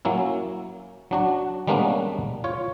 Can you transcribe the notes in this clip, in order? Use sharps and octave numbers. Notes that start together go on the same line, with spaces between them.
F#3 A#3 C#4 E4
F#3 D4 F#4
G3 G#3 A#3 B3 C#4 D4
F4 C#5